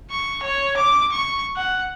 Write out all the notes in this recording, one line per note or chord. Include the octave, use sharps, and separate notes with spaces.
C#6
C#5
D6
C#6
F#5